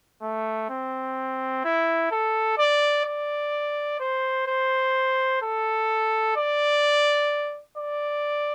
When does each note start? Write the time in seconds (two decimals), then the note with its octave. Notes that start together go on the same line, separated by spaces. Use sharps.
0.22 A3
0.70 C4
1.65 E4
2.11 A4
2.58 D5
3.05 D5
4.00 C5
4.47 C5
5.42 A4
6.36 D5
7.78 D5